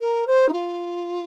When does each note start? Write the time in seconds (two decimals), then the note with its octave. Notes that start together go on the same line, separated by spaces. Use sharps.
0.01 A#4
0.27 C5
0.49 D#4
0.52 F4